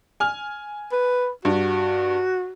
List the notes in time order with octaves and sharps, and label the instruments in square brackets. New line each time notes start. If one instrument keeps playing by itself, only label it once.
[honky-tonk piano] G#5 F6
[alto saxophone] B4
[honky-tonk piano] G2 [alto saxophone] F#4